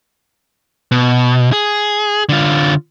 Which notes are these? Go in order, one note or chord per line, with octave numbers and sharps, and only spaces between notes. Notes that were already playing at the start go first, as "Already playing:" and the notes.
B2
G#4
D3 F4